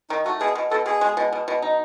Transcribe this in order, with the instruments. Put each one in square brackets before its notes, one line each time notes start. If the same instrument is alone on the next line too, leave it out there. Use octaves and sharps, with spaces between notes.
[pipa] D#3 [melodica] D#4
[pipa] A3 [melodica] F#4
[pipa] B2 [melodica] G#4
[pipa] B2
[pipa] B2 [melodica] A4
[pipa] B2 [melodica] G#4
[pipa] G#3
B2
B2
B2
D#4